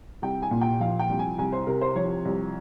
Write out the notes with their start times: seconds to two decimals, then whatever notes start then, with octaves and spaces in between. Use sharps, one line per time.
0.22 C2 G5
0.42 G#5
0.51 A#2
0.61 G5
0.80 F3 F5
0.99 G5
1.09 C2
1.19 G#5
1.38 C2 G#5
1.52 C5
1.67 C3 A#4
1.81 C5
1.96 F3 C#5
2.25 C2